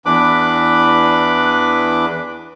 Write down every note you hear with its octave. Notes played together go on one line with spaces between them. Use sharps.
E2 E3 D4 B4 B5 D6